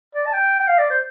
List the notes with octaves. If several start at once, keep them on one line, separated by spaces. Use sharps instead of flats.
D5
A5
G5
G5
F5
D5
C5